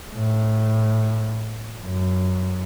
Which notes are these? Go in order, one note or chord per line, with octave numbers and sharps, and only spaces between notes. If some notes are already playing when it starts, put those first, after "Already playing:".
A2
F#2